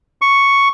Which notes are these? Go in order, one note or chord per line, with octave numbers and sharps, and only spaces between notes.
C#6